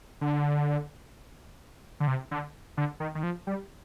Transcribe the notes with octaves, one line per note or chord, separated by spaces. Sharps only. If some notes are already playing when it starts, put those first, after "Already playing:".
D3
D3
C3
D3
D3
D#3
D#3
F3
G3